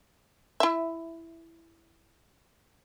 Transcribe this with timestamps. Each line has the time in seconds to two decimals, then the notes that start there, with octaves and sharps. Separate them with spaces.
0.60 E4 E5